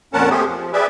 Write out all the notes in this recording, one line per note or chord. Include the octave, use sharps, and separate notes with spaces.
F2 A#2 C#4 A#4 F#5 A5
A3 C4 G4 G#4
F3
G4 G#4 B4 D5 E5